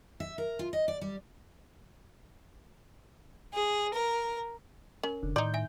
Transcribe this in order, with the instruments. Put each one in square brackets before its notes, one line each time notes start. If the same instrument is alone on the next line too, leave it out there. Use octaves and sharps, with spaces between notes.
[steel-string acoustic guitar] E5
A#4
F4
D#5
D5
G3
[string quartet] G#4
A#4
[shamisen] C#4 [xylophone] A#4
[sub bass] F1 [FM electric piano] D3
[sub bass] A2 [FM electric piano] D#3 G6 [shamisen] D#4 D5 [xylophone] C6
[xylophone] E5 G#5